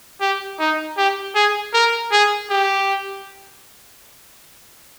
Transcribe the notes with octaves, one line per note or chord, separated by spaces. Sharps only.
G4
D#4
G4
G#4
A#4
G#4
G4